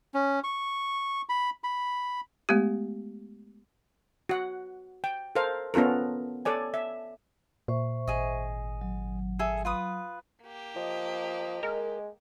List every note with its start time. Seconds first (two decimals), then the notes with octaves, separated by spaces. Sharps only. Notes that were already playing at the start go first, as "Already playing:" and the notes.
0.14 C#4
0.44 C#6
1.29 B5
1.64 B5
2.49 G#3 A3 B3 G4
4.29 F#4 F#5
5.04 G5
5.35 A4 A#4 C5 F5
5.74 B3 C#4 F4 A4 A#4
6.45 A4 C#5 D5 G#5
6.74 E5
7.68 A#2 C5 E5 C#6
8.08 G#1 G#4 D#5
8.81 F#3
9.39 G#4 A4 E5
9.65 F4 B4 D#6
10.42 A#3 G4
10.76 F3 D#5
11.63 G#3 A#4